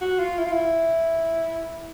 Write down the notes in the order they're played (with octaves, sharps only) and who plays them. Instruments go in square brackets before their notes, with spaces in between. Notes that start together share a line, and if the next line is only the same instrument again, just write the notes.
[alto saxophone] F#4
F4
E4
F4
E4